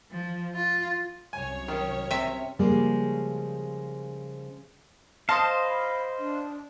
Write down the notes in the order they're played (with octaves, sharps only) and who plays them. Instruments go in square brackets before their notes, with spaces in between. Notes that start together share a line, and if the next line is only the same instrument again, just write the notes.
[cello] F3
F4
[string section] C2 F#2 C#5 [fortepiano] G#5
[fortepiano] D#3 C#4
[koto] C3 E5
[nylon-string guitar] C#3 F3 G3 G#3 A#3
[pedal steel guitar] C5 D#5 F5 [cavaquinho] A5 C6 D#6
[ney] B5
D4